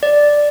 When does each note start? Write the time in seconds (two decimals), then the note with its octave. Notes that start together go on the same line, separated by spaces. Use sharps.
0.03 D5